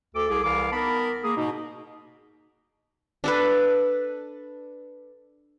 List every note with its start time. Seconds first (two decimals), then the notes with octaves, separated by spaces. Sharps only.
0.15 D2 A4 D6
0.29 C2 G#4 D6
0.44 C2 E3 F5 D6
0.73 B3 D#4 A#4 A5 B5
1.24 A#3 G#4
1.37 G#2 B2 D#4
3.24 D4 A4 B4